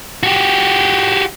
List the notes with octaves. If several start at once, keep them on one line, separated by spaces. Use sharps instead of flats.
F#4 G4